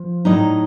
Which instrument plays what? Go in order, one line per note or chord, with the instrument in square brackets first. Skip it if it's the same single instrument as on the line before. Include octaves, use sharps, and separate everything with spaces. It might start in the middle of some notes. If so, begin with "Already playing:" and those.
Already playing: [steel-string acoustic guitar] F3
A2 F#3 D#4 D#5